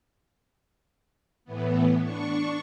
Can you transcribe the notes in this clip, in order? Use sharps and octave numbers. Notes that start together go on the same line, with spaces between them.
A2 E3 B3
D4 C#6